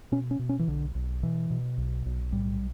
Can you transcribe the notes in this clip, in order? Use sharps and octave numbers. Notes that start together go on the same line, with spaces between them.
B2 C#4
C#4
B2
C#4
E3
B1 D3
B1
B2 E3
B2
B1
B1
A2 G3